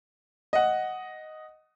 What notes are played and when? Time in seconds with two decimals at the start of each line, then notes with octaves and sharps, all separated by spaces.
0.53 D#5 F#5